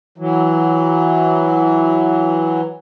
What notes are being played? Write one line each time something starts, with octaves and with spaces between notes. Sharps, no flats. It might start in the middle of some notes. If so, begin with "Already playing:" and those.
E3 F#3